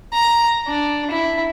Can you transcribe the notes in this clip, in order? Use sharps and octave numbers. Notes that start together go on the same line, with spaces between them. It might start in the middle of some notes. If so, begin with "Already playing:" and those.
A#5
D4
E4